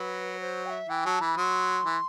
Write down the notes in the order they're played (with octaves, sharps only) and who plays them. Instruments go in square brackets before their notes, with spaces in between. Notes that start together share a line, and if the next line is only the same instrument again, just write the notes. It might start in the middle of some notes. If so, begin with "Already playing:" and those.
Already playing: [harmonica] F#3 [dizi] B4
[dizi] C5
G5
E5
[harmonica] E3 [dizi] G5
[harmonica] F#3 [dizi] A5
[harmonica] E3 [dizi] B5
[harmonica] F#3 [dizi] C6
[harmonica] E3